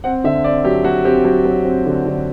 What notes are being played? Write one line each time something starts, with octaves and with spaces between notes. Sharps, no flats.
C4 F#5
D3 E5
C4 D5
F#3 G4
F#3 F#4
C4 G4
F#3 F#4
F#3
C4
D3
D3